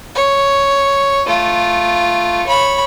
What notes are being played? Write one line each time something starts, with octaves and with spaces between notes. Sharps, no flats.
C#5
A3 F4
C#5 B5